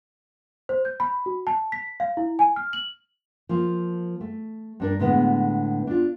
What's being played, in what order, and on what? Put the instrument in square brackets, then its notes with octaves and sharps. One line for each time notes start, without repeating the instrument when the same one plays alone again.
[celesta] C5
G6
B5
F#4
A5
B6
F5
E4
G#5
F6
F#7
[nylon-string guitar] F3 A#3
A3
G2 D4 A#4
A2 D3 G#3 B3
D4 F4